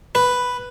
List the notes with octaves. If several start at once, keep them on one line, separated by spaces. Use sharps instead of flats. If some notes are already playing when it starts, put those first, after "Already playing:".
B4